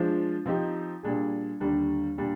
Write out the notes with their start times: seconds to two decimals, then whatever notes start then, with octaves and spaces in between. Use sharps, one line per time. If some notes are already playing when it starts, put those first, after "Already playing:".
Already playing: F3 G#3 D4 F4 C5
0.46 F3 C4 D#4 G4
1.03 A#2 G3 D4 G#4
1.60 D#2 D3 G3 D4
2.18 A#2 G3 D4